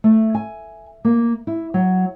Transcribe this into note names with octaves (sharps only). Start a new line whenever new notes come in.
A3
G#5
A#3
E4
F#3